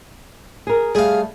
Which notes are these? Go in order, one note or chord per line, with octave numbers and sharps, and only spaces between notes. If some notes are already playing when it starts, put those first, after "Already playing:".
G#4 A#4
G3 A3 G#4 F5